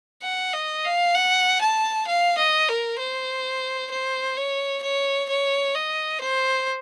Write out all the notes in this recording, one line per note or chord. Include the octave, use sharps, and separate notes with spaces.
F#5
D#5
F5
F#5
A5
F5
D#5
A#4
C5
C5
C#5
C#5
C#5
D#5
C5